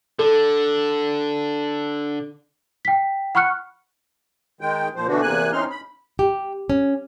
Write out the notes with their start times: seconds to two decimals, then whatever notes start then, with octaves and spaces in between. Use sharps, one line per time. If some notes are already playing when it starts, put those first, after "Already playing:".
0.19 D3 A4
2.85 G5 B6
3.35 F#5 B5 C#6 F6 F#6 C#7
4.61 D#3 G#3 G5
4.96 A#2 F3 C5
5.07 B2 D3 E3 A3 D4 F#4
5.22 E2 C3 A#3 G#5 F#6
5.52 E3 C4 C#4 D#4 C6 F6
5.70 B5
6.19 G4
6.70 C#4